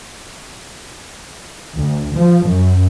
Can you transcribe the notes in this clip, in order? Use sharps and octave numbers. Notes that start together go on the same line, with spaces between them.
D2
F3
F#2